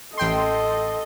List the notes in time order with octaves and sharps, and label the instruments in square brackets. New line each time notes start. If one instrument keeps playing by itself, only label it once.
[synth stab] A1 G5 C6 [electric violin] A4 D#5